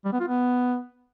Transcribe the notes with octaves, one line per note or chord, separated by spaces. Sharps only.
G3
B3
F4
B3